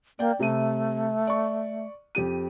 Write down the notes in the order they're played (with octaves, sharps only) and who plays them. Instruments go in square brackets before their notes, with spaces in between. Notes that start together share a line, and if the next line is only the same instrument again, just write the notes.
[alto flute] A#3 [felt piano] D5 G5
[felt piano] C3 D#7 [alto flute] A3
[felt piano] D5 C#6
F2 G4 D#7